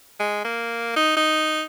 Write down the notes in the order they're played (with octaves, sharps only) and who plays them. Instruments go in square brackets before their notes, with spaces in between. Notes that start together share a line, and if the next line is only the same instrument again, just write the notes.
[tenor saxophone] G#3
A#3
D#4
D#4